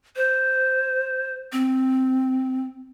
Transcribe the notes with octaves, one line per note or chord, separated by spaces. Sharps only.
C5
C4